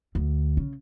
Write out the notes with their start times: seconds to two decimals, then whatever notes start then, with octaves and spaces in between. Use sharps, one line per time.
0.15 D2
0.57 C#3